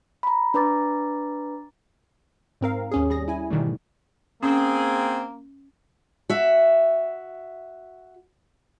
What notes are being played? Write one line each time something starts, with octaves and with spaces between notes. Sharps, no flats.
A#5 B5
D4 B4 A#5 D6 A6
G#2 C4 A#4 F5
D#2 C#4 G#4
G3 G#4 A#6
E4 G#5
G#2 B2 D#3 E3 G3 A3
A#3 C4 C#4 G#4
F#4 E5